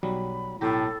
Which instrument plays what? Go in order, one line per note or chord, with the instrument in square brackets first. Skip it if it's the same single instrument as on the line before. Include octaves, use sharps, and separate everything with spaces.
[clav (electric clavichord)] B1 F#3 G3 [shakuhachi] B5
[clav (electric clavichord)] B1 G4 A#5 [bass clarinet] A2 [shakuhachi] A4